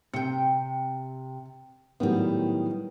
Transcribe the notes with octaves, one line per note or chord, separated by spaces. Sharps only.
C3 G5 C#7
A2 D#3 F#3 G3 B3